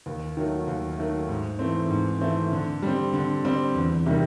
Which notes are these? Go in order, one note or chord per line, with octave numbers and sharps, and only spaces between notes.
D#2
D#3 F#3 A3
D#2
D#3 F#3 A3
G#2
E3 A3 C4
G#2
E3 A3 C4
D3
G3 C4
D3
G3 C4
E2
C3 D#3 G3